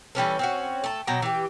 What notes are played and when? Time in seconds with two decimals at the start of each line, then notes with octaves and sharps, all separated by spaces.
0.15 E3 G3 C#4 A4
0.39 C4 C#4 F#4
0.84 A3 A5
1.07 B2 F#3 G5 A#5
1.22 E3 G4